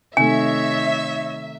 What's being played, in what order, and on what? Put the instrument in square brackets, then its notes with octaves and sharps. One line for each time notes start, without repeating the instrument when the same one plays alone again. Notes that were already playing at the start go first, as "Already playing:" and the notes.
[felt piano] C3 D#3 A3 [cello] D#4 C#5 [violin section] E5 [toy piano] G#5